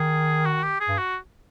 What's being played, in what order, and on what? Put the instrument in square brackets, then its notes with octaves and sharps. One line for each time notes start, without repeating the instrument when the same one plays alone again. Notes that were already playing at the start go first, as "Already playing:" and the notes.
Already playing: [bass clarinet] D#3 [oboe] G#4
[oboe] F#4
G4
G#4
[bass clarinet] G2
[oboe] F#4